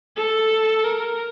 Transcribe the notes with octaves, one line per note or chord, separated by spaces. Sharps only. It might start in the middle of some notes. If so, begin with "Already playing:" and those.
A4
A#4